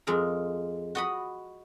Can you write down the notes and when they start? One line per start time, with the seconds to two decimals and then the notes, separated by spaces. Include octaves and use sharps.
0.07 F2 G#3 A#4
0.95 F#4 D#5 B5